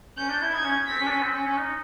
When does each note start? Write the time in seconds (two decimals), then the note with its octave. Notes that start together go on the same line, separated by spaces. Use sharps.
0.18 C#4 G6
0.30 D4
0.42 E4
0.53 D#4 G#6
0.64 C#4
0.87 C4 B6
1.00 C#4
1.07 D4
1.11 C#4
1.23 C4
1.34 C#4
1.47 C#4
1.57 D#4